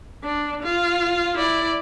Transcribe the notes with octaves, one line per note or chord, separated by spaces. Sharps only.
D4
F4
E4 D5